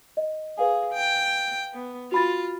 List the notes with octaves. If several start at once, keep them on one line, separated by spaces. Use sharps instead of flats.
D#5
G#4 B4 F5 G#5
G5
B3
F4 F#4 B5 A6